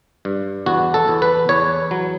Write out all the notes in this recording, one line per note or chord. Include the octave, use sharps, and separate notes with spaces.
G2
E2 F#4
A4
E2
B4
E2 C#5
F#3